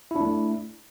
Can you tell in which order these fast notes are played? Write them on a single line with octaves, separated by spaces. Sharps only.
E4 D4 A3